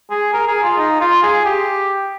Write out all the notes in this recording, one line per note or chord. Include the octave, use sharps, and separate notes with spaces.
G#4
A#4
G#4
F4
D#4
F4
G#4
G4